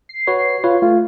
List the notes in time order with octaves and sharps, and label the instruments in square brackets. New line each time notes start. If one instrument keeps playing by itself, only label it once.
[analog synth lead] C7
[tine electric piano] F#4 B4 C#5
[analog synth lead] F4 [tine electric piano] B4 C#5
[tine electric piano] A3 [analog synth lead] F4